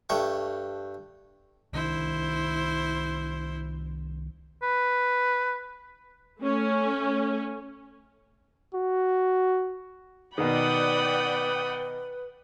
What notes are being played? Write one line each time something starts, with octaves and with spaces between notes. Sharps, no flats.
G2 A3 G5 C#6
C2 D#3 D4 E4 C5
B4
A3 C#4
F#4
B2 D#3 B4 D5 F#5 G5 B5 D#6